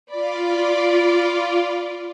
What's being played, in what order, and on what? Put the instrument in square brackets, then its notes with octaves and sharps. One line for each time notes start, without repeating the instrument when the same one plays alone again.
[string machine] F4 [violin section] D5 B5 D6